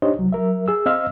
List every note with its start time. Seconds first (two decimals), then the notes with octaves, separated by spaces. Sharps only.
0.02 D4 D#4 G4 C5 C#5 D#5
0.17 C2 F#3
0.32 F#3 A#4 E5
0.68 G#4 E6
0.86 C4 C5 D#5 F5 E6 F6